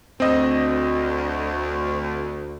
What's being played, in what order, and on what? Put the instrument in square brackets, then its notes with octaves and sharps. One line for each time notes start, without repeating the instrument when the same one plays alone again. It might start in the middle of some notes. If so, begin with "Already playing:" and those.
[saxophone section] D2 [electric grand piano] C4 D#5